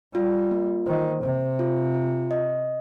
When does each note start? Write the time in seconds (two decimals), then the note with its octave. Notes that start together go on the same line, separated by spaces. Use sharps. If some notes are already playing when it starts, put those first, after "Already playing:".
0.14 G3 F4
0.51 A#3
0.87 D#3 C5
1.23 C3 C5
1.59 F4
1.94 F4
2.31 D#5